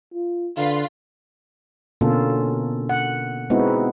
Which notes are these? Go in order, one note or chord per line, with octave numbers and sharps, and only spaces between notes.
F4
D3 F4 B4
B2 D3 A#3 C#4 F4 A4
F#5
G#3 B3 C4 D#4 E4 F#4